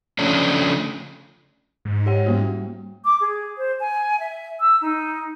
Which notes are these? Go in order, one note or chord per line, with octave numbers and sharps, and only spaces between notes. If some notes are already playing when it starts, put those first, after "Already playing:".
C#3 F3 A3 C#4 D4
G#2
G4 C#5 F#5
G3 A#3 F#4
D6
G#4
C5
G#5
E5
E6
D#4